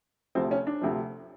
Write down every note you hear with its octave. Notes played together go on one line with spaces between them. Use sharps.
D2 C3 F3 C4
C#4
D4
D2 C3 F3